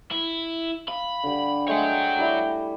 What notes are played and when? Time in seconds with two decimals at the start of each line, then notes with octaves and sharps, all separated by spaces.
0.11 E4
0.88 F5 B5
1.24 D3 G3
1.68 G#3 A3 C#5 F#5 G5
2.19 G3 E4